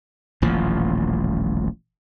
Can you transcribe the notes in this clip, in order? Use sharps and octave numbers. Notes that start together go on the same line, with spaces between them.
D#1 A1 A#2 F3